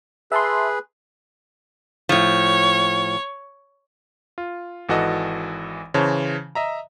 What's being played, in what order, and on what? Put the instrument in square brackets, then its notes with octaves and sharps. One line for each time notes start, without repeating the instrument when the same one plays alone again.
[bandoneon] G#4 B4 [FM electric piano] E5 A5 C6
[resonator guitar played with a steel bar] A2 F3 [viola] C#5
[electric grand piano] F4
G#1 E3 F#4 A4 D#5
C#3 E3 C5 C#5 A5
D#5 E5 A#5